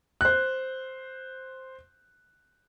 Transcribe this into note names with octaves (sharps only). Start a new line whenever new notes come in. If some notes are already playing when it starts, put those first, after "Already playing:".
C5 F#6